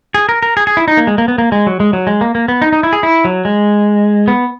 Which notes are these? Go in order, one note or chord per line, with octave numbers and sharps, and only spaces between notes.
G#4
A#4
A#4
G#4
G#4
E4
D#4
A#3
G#3
A#3
B3
A#3
G#3
F#3
G#3
F#3
G#3
A#3
A#3
B3
D#4
D#4
E4
G#4
E4
F#3
G#3
B3